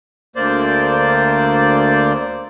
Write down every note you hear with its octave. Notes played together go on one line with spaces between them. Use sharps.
D2 A#3 C5 D5